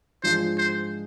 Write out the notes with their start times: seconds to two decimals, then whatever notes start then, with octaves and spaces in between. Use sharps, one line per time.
0.23 G#2 F3 G#3 D4 F4 C5
0.58 C5